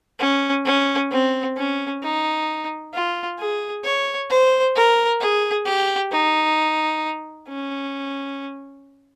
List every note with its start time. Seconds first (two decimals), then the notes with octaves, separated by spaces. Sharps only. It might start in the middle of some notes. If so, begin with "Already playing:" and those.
0.19 C#4
0.65 C#4
1.11 C4
1.57 C#4
2.02 D#4
2.93 F4
3.39 G#4
3.84 C#5
4.30 C5
4.75 A#4
5.21 G#4
5.66 G4
6.12 D#4
7.49 C#4